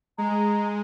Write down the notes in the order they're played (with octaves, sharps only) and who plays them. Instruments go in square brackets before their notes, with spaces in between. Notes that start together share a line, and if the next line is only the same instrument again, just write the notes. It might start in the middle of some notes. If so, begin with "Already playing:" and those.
[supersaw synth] G#3 [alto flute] A#5